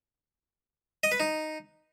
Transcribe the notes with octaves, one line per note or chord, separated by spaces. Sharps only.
D#5
B4
D#4